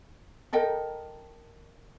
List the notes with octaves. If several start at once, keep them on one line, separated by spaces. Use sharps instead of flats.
A4 A#4 D#5 G5